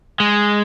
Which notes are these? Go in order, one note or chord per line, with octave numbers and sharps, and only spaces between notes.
G#3